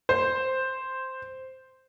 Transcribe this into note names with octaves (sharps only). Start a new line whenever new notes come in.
C5